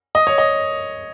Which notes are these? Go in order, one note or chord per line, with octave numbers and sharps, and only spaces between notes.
D#5
C#5
D#5